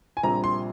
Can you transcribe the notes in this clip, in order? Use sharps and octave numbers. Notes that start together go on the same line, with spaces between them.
G#5
A#1 A#2 G3 C4 A#5
C6